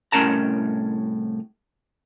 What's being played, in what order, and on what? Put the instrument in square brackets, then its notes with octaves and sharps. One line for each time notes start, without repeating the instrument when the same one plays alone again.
[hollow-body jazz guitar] C2 A2 C#4 A#4 A5 A#5